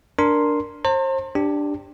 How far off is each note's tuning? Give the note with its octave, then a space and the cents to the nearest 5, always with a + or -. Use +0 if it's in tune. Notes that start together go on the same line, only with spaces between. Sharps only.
D4 +0 A#4 +0 C6 +0
C5 +35 A#5 -45
D4 +0 G4 +5